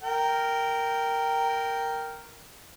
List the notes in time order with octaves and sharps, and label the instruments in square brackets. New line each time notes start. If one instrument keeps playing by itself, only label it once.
[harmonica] A#4 G5